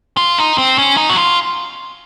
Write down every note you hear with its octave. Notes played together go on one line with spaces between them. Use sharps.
F4
D#4
C4
C#4
D#4
F#4
F4